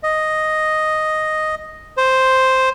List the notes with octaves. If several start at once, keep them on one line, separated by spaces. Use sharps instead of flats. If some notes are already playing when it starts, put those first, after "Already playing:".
D#5
C5